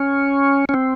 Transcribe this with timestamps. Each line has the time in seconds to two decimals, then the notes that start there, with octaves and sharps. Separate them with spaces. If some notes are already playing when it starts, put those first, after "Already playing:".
Already playing: C#4
0.69 C#4
0.74 C4